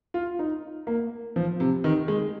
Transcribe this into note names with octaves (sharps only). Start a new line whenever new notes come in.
F4
D#4
A#3
F3
C3
D#3
G#3